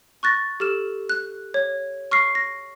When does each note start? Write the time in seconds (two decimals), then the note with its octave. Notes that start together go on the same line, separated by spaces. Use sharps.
0.23 C#6 F#6 A6 A#6
0.60 G4 A4 F6 E7
1.09 F#6
1.54 C#5
2.11 C#6 F6 A#6 C7
2.35 A#6